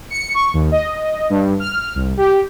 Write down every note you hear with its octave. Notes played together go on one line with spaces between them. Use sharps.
C#7
C#6
D#2
D#5
G2
F6
C2
G4